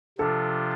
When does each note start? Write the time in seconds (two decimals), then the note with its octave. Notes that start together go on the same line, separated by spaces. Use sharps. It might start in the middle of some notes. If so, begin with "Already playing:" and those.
0.18 C3 F3 D4 F4 A4